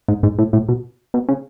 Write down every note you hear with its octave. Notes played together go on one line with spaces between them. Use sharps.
G#2
G#2
A2
A2
B2
B2
C#3